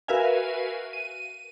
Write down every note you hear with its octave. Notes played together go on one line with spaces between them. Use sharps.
F#4 A#4 B4 E5 F5 G#5
D#7